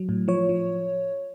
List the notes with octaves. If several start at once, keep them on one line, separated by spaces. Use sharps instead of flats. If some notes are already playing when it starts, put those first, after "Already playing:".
Already playing: F#3
A2
F3 C#5
F3